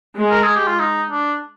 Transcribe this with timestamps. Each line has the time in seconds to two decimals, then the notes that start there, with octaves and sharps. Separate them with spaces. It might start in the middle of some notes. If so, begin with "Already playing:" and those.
0.16 G#3
0.31 A#4
0.43 G#4
0.55 G4
0.67 F4
0.80 D#4
1.11 D4